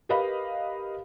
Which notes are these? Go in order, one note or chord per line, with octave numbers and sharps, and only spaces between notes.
G4 A#4 B4 D#5 F5 B5